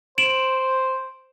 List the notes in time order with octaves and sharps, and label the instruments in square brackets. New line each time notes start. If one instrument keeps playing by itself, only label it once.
[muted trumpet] C5 [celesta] D7 E7 F#7